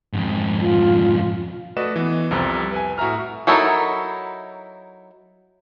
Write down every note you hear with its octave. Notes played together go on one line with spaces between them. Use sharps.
F2 G#2
F4
A3 F#4 B4 D5 D#5 E7
E3 B3
C2 F2 C3 A#5
B4 G#5
A2 F#4 E5 A#5 F6
F#3 D#4 E4 A4 A#4